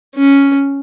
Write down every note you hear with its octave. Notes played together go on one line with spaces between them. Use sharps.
C#4